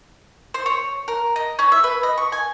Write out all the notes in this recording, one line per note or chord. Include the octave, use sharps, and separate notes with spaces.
C5
C#5
A#4
D#5
C#4
E5
B4
D#5
C#6
G#5